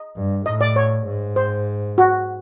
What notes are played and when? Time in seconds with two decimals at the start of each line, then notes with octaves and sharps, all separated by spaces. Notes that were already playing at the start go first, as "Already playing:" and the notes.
Already playing: D#5
0.15 G2
0.46 A2 D#5
0.61 D5
0.76 C#5
1.07 G#2
1.36 C5
1.98 F#4